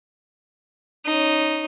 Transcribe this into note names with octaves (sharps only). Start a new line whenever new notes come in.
C#4 D#4